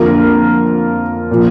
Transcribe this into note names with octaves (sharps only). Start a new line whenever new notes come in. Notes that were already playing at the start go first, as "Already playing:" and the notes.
Already playing: F2 D3 A#3 F4 A#4
A#2 F3